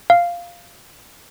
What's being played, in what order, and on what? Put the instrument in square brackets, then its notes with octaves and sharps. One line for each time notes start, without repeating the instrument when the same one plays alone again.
[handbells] F5